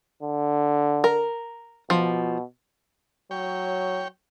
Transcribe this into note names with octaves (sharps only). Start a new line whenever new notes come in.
D3
A#4
B2 F3
F#3 C#5 G5